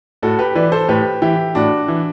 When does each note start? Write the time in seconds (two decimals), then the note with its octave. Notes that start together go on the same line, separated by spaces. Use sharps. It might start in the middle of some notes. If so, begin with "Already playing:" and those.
0.23 A2 F#4 A4
0.39 G4 B4
0.55 E3 B4 D5
0.72 A4 C5
0.89 A2 G4 B4
1.22 E3 E4 G4
1.55 A2 D4 F#4
1.88 E3